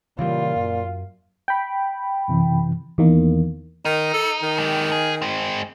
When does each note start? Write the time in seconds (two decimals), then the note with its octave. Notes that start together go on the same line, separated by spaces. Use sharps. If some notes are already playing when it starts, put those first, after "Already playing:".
0.19 A#2 C#3 E3 G3 F4
0.56 F#2
1.48 G5 B5
2.28 F#2 C3 E3
2.98 E2 D#3 E3 A#3
3.85 D#3 D#4
4.14 A4
4.42 D#3
4.58 G#3 G4
4.92 G#4
5.22 G#3 C4